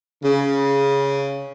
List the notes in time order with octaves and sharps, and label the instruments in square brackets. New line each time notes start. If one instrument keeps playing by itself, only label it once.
[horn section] C#3